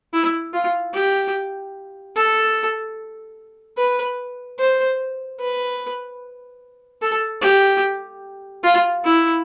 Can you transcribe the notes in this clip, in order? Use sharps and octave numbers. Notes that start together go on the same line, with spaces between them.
E4
F4
G4
A4
B4
C5
B4
A4
G4
F4
E4